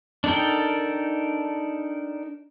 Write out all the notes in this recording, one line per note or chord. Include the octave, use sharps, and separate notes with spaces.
D4 D#4 A4 A#4 G5